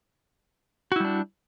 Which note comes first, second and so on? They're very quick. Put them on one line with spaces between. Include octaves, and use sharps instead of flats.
F#4 E4 G3 D4